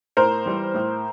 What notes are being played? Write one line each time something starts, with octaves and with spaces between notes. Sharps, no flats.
A2 A#4 C5
E3 G3
A2